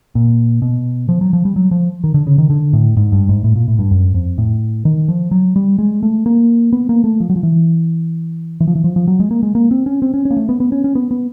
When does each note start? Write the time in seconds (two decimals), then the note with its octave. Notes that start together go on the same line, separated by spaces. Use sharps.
0.15 A#2
0.62 B2
1.09 F3
1.21 F#3
1.33 F3
1.45 G3
1.56 F#3
1.71 F3
2.04 D#3
2.14 D3
2.27 C#3
2.38 D#3
2.50 D3
2.73 A2
2.97 G#2
3.12 G2
3.29 G#2
3.44 A2
3.56 A#2
3.68 A2
3.79 G2
3.91 F#2
4.14 F2
4.38 A2
4.85 D#3
5.08 F3
5.31 F#3
5.56 G3
5.79 G#3
6.03 A3
6.26 A#3
6.73 B3
6.89 A#3
7.04 A3
7.20 F3
7.30 F#3
7.36 F3
7.43 E3
8.61 E3
8.68 F3
8.75 E3
8.84 F3
8.96 F3
9.08 F#3
9.20 G#3
9.31 A#3
9.43 G#3
9.55 A#3
9.71 C4
9.86 C#4
10.02 C4
10.14 C#4
10.25 C#4
10.31 A#3
10.37 A3
10.49 B3
10.60 B3
10.72 C#4
10.84 C#4
10.95 B3
11.11 B3